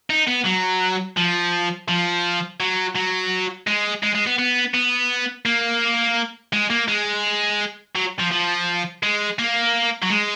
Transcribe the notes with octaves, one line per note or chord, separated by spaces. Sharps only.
D#4
B3
F#3
F3
F3
F#3
F#3
G#3
G#3
G#3
B3
B3
B3
A#3
G#3
A#3
G#3
F#3
F3
F3
G#3
A#3
F#3
G#3